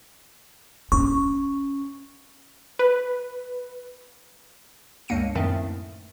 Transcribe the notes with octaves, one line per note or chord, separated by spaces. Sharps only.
C#4 C#6
B4
C#2 G2 A#3 C#7 D#7
F#2 A2 D#3 A3 C4